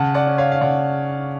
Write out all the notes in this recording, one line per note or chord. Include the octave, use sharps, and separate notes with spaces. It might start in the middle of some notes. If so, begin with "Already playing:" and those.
Already playing: C#3 F#5 A5
D5 F#5
C#4
C#5 F5
F5
C#3 D5 F#5